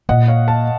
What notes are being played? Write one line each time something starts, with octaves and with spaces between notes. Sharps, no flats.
A#2 D#5 F#5
C#5 F5
F5 A5